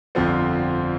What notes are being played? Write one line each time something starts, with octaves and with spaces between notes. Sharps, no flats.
G1 F2 D3 F3 C4